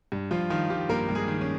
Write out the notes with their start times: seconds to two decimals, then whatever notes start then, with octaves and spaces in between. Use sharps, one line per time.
0.12 G2
0.31 G2 F3 F4
0.50 D#3 F3 F4
0.70 D#3 G3 G4
0.89 G2 A#3 A#4
1.09 G2
1.15 G#3 G#4
1.28 D#3
1.41 C#4